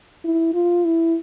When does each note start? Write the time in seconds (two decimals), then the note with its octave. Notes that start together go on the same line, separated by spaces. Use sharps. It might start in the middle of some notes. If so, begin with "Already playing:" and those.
0.25 E4
0.54 F4
0.85 E4